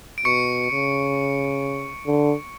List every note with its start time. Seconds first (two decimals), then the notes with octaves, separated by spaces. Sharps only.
0.18 D7
0.25 B2 C#6 C#7
0.71 C#3
2.06 D3